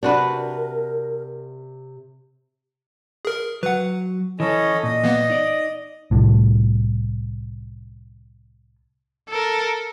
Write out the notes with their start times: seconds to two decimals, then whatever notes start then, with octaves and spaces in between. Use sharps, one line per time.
0.03 C3 D4 F#4 A#4 B4
3.25 G#4 A#4
3.63 F#3 B4 F#5
4.40 E3 C#4 A4 D#5
4.83 A#2 D#5
5.04 E3 A#3 B3
5.30 D#4 D5
6.11 C2 A2
9.28 A4 A#4